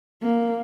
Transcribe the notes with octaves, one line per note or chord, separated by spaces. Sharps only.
A#3